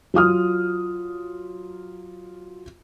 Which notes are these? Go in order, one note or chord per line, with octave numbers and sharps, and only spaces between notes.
F#3 F4 D#6 F6